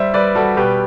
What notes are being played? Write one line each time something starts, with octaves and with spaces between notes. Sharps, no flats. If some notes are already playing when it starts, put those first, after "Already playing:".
Already playing: G3 C5 E5
G3 B4 D5
G3 F#4 A4
B2 G4 B4